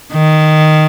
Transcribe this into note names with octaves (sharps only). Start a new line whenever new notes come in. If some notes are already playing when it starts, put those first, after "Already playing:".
D#3